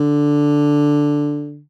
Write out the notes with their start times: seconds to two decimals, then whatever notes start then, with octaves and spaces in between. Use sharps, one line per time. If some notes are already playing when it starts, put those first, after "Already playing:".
Already playing: D3